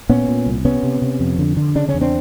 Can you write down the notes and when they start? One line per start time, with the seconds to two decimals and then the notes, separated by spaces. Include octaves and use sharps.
0.09 A#2 B3 C#4
0.28 A#2
0.46 C2
0.65 C3 B3 C#4
0.83 C3
1.02 C3
1.20 F2
1.39 D3
1.57 D3
1.75 C#3 D4
1.89 C#4
1.94 E2
2.01 C4 D4